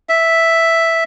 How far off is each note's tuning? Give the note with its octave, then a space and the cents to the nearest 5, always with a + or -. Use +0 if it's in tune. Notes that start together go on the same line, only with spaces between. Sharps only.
E5 +0